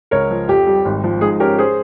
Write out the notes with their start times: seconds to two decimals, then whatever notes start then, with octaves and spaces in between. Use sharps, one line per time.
0.11 C#2 A#4 C#5
0.31 F3
0.48 F2 G4
0.67 G3
0.85 G#1
1.04 F3
1.21 G#2 G#4
1.40 C#4 G4 A#4
1.58 G#4 C5